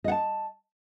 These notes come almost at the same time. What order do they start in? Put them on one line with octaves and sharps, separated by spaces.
D#5 F#5 A5